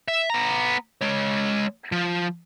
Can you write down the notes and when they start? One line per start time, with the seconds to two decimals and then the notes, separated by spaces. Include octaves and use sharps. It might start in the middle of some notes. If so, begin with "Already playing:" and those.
0.08 E5
0.30 B3 A#5
1.01 G#3 C#5
1.92 F3